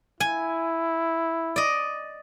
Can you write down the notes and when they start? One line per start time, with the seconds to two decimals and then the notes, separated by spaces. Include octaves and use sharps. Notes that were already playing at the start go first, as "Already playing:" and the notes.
0.20 E4 G#5
1.56 D5 D#5